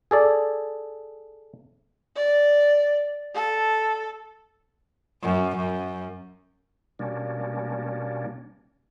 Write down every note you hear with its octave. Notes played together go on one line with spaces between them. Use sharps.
G#4 A4 D5
D5
A4
F#2
F#2
B2 G3 A#3 C#4 D4